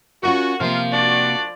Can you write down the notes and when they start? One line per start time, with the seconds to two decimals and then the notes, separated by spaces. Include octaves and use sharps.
0.23 C#4 F4 F#4 A#4
0.60 C3 F3 A#3 F4 A#4 F5
0.92 D4 F#4 D5